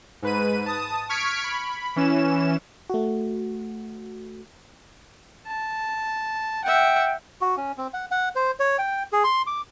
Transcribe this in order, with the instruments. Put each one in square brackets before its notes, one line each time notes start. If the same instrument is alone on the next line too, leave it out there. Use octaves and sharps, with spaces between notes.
[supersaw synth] G#2 B4 D#7
A5 D#6
C#6 F6 G#6 B6 C#7 D7
B5
E3 C#4 E7
[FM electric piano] A3 F#4
[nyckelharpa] A5
[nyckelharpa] E5 F#5 [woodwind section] G5
[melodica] F#4
C#4
C4
F#5
F#5
C5
C#5
G5
G#4
C6
D6